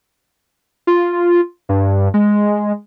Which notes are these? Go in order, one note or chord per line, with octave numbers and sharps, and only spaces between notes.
F4
G2
G#3